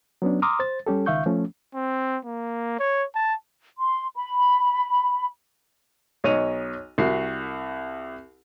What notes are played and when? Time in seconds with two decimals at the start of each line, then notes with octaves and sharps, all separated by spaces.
0.22 F#3 B3 C#4 D4
0.42 A#5 C6 D6 D#6 F6
0.59 C5 A6
0.86 G3 C#4 G4 A4
1.06 C#2 D#3 E5 F5 C#6 G6
1.26 F3 A3 C#4
1.74 C4
2.25 A#3
2.79 C#5
3.15 A5
3.79 C6
4.16 B5
6.24 B1 C#5 D#5 D#7 F7
6.98 C2 F#4 C7